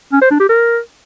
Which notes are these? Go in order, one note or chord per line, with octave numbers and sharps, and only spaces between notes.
C#4
C5
D4
G4
A#4